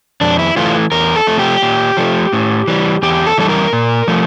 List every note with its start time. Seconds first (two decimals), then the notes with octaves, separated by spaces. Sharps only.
0.21 F2 D4
0.39 E4
0.57 E3 A3 F4
0.92 E2 A#4
1.16 A4
1.27 C3 F3 A3
1.39 G4
1.62 A#2
1.97 F3 A3
2.33 A2
2.67 E3 G3
3.03 E2 G4
3.26 A4
3.38 E3 G3 A4
3.49 A#4
3.73 A#2
4.08 F3 A3